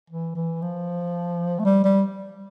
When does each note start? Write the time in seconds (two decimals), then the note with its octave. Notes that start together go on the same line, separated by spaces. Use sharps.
0.10 E3
0.35 E3
0.62 F3
1.59 A3
1.65 G3
1.84 G3